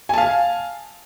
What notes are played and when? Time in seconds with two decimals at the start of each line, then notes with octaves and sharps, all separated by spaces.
0.09 G#5
0.13 A5
0.18 F5